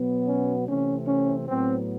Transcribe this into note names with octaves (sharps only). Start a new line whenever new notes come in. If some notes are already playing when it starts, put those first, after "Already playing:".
Already playing: B2 F#3 B3
C#4
C3 E3 A3 C4 C#4
C#4
A2 F#3 B3 C4